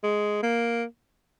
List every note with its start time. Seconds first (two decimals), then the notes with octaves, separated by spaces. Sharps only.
0.03 G#3
0.43 A#3